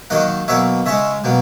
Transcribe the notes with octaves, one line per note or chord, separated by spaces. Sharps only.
D#3 F#3 A#3 D#5 F#5
B2 F#3 A#3 C#5 E5
C#3 G#3 C#5 E5
B2 F#3 A#3